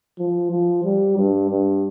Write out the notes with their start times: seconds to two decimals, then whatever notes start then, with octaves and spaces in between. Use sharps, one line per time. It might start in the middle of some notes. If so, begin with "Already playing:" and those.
0.18 F3
0.51 F3
0.84 G3
1.18 G2
1.50 G2